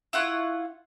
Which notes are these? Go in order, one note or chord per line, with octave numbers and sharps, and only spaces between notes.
E4 F4 F#5 C#6